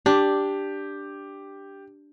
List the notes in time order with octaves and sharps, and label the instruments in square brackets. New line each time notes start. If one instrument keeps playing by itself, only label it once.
[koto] D4 [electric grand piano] G4